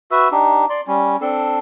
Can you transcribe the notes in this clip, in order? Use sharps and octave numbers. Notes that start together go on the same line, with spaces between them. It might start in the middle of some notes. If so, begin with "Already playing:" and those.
F#4 B4 E5 E6
D4 D#4 G4
D5 C6
G3 C#4
C4 D4 A4